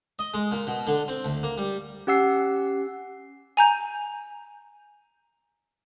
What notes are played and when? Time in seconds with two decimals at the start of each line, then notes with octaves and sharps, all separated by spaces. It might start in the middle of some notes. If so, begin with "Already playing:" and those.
0.19 D#5
0.34 G#3
0.52 A#2
0.67 B2
0.87 D3
1.08 C4
1.25 D2
1.43 A#3
1.58 G3
2.07 C#4 G4 F#5 E6 C7
3.57 G#5 A#5 G6